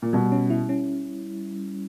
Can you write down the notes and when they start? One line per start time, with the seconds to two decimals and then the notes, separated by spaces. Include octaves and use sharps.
0.02 A#2
0.13 B2 G3
0.32 C#4
0.50 E4
0.69 C#4